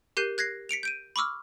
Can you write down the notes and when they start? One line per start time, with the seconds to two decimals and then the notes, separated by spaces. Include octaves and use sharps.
0.17 G4 A#4 F#6 G6 C7 D#7
0.38 F#6 G#6 A#6 C7
0.69 B6 C#7 D7 F7
0.83 G6 D7 D#7
1.16 B5 C#6 D6 E6 F6